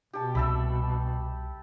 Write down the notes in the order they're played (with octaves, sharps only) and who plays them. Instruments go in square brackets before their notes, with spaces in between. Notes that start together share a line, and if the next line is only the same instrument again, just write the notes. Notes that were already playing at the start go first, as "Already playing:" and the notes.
[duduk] B2 [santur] G4 A5
[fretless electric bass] C2 [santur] A4 E5 B5